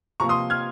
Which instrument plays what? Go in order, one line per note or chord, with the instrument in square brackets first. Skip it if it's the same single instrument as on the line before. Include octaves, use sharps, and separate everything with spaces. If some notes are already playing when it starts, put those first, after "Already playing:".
[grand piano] C3 F3 A#3 A#5 C#6
C6 D#6
F6 G#6